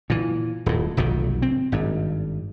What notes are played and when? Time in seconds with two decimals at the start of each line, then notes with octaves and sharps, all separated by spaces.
0.10 A#2 E3
0.66 D#1 A2
0.97 F1 B1 G#2 D#3
1.42 C4
1.72 G#1 G2